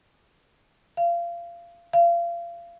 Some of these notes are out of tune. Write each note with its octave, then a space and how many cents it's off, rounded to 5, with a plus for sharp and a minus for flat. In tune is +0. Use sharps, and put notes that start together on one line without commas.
F5 -25
F5 -30